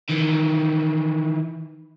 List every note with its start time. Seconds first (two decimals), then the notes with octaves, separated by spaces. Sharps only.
0.10 D#3 E3